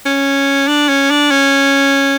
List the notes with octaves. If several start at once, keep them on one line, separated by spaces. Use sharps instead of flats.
C#4
D4
C#4
D4
C#4